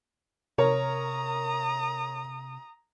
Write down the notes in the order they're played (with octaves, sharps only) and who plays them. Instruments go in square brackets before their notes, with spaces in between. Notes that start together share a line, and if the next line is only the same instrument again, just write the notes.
[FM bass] C3 [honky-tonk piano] A#4 [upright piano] C#5 [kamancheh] A#5 D#6